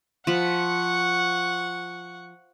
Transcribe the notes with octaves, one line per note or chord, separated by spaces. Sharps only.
F3 F#5 B5 C#6